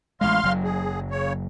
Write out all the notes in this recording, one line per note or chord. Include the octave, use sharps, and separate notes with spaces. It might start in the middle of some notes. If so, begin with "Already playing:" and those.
A1 G#3 F5 C6 F6
F#1 F#3
G#4
C#3 C#5